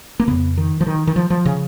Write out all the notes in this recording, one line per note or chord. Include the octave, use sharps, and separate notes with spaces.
A#3
F2 C#3 B3
D#3
F3
D#3
D#3
F3
F3
C#3